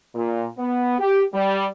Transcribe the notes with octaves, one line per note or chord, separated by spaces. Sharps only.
A#2
B3
G4
G3